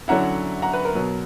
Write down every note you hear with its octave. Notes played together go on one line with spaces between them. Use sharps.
D3 F#3 C#4 E4 F#5 A#5
F#5 A#5
B4
A#4
B2 F#3 B3